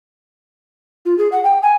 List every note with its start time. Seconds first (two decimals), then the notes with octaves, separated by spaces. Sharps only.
1.06 F4
1.18 G#4
1.32 F#5
1.44 G5
1.63 G#5